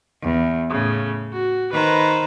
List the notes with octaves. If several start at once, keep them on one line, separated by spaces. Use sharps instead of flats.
E2
A2 C#3
F#4
D#3 B4 C5 A#5